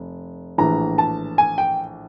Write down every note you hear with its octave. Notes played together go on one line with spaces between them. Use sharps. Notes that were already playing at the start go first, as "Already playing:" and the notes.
Already playing: F1
A#1 A2 E3 A#5
A5
G#5
G5